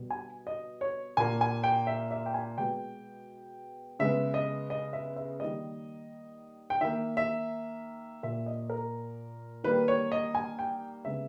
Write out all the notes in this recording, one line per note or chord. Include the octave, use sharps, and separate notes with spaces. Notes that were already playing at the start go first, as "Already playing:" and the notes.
Already playing: B2 G3 B3
G#5
D#5
C#5
A#2 A#3 G#5
G#5
G5
E5
E5
G5
G#5
B2 G#3 B3 G5
C#3 G#3 B3 E5
D#5
D#5
E5
E5
D#3 G3 A#3 D#5
G5
D#3 A#3 E5
E5
A#2 A#3 E5
D#5
A#4
D#3 G3 A#3 B4
C#5
D#5
G#5
G5
C#3 G#3 B3 E5